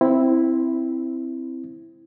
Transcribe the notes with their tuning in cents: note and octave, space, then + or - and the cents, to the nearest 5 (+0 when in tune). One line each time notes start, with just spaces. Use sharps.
C4 +0 E4 +0